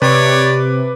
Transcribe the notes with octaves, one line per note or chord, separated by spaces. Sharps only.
C3 B4 C#5 D5 D6